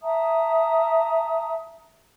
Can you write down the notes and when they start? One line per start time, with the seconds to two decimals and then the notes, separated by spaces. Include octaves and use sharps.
0.01 E5 A5 A#5 D#6